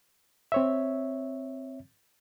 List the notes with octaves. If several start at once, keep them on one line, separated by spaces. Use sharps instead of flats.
C4 C#5 E5